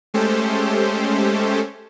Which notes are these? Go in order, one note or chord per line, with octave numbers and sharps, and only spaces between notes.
G#3 A3 C#4 G4 A4 C5